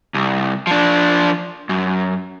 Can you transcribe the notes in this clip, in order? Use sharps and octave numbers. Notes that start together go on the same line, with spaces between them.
C2
F3 D4
F#2